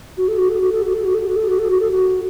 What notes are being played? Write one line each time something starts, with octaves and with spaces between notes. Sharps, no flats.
F#4
A4
F#4
A4
F#4
A4
F#4
A4
F#4
A4
F#4
A4
F#4
A4
F#4
A4
F#4